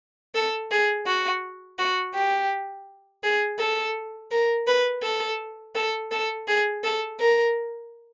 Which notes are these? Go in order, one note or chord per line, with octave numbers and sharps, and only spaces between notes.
A4
G#4
F#4
F#4
G4
G#4
A4
A#4
B4
A4
A4
A4
G#4
A4
A#4